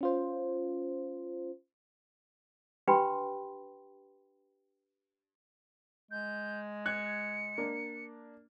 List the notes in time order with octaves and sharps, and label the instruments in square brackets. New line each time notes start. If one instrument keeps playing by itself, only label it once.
[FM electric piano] C#4 F4 C5
[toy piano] D4 G4 B4 G5 B5 C6
[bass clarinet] G#3 [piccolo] G6
[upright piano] F#6 G#6 [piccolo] C#7
[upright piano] A#3 D4